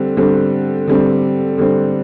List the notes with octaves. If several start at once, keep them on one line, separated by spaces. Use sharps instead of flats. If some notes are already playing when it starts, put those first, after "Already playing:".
Already playing: D3 G3 C4
D3 G3 C4
D3 G3 C4
D3 G3 C4